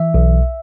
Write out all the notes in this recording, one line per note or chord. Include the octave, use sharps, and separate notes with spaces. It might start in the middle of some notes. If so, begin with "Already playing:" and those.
Already playing: E3 E5
B1